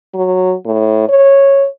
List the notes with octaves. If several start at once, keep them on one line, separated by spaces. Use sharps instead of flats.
F#3
A2
C#5